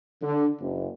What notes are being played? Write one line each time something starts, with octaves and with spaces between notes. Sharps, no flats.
D3
F#1